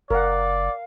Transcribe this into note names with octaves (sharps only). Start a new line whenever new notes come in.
F#1 A#4 D5 F5 F#5